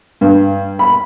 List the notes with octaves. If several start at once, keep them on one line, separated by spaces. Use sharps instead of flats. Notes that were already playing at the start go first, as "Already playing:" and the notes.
G2
B5